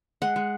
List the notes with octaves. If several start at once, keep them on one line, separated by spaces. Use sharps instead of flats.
G#3 F#5
G#3